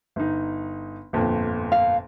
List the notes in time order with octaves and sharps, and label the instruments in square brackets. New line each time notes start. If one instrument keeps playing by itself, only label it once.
[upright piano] G1 D#4
G1 F2 A#2
[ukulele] F5